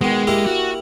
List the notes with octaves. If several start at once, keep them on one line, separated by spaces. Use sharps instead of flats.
B2 D#3 G#3
A#3 E4 G4
F#4